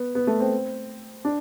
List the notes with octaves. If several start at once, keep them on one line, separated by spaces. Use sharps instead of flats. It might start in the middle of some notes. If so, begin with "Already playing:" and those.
Already playing: B3
B3
A3
C4
D4